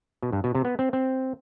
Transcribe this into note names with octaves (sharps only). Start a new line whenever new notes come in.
B2
G2
B2
C3
B3
C4
C4